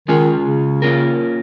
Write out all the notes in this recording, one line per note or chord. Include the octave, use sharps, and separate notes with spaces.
D#3 G#3 C#4 F4 G#4
C#3
A#3 C#4 F4 A#4